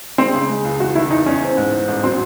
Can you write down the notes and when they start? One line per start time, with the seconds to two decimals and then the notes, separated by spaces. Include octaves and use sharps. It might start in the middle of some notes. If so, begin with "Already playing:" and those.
0.18 G#3 C4
0.34 C#3
0.48 G#3
0.64 C#2
0.80 E2 F#4
0.95 D#3 E4
1.11 E2 D#4
1.26 E2 C#4
1.41 C4
1.57 G#2
1.73 E3
1.88 A1
2.03 F#3 C4